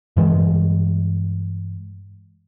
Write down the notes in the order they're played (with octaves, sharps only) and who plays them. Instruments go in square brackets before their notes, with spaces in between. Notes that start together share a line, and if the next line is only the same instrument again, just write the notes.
[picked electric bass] G2 E3 G#3